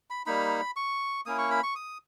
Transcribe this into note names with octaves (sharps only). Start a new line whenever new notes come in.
B5
G3 A#3 D#4 B5
C#6
A#3 C#4 E4 D#6
C#6
B5
C#6
D#6